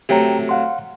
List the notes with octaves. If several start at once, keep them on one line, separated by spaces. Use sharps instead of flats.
C3 F#3 A3 G4 G5 A#5
F5 F#5 C6